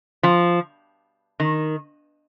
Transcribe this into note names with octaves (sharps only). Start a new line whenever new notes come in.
F3
D#3